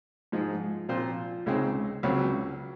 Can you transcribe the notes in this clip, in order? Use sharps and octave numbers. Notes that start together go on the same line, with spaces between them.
G#2 F3 G#3 D#4
A#2 F3 C4 F4 C5
C#2 C#3 G#3 C4 D#4
C#2 C#3 F#3 C4